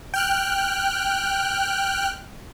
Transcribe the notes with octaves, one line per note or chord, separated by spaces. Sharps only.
G5 F6 F#6